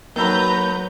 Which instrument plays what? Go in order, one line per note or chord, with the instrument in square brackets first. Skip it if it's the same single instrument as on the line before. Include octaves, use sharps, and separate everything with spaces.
[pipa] D#3 A4 B5 [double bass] F#3 [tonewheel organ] A#3 [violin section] B4 A#5 G6